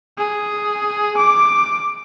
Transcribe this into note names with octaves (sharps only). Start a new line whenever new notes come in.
G#4
D6